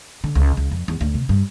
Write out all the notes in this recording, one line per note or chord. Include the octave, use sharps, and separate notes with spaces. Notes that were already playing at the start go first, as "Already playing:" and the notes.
D3
C#2
C#2
F2
E2
D2
C3
G2